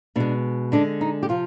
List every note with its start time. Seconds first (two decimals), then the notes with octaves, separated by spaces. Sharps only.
0.16 B2 G#3 D4
0.72 D3 G#3 D4
1.01 D#4
1.23 G4
1.29 C3 F3 F4